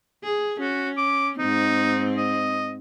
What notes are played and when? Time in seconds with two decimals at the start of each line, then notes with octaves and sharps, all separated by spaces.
0.24 G#4
0.60 C#4 F#4
0.98 D6
1.39 G#2 C4 D#4
2.17 D#5